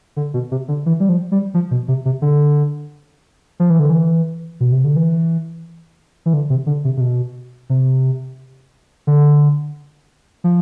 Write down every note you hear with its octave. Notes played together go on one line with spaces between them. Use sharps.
D3
B2
C3
D3
E3
G3
F3
G3
F3
B2
C3
C3
D3
F3
E3
D3
E3
B2
C3
D3
E3
E3
D3
C3
D3
C3
C3
B2
C3
D3
F3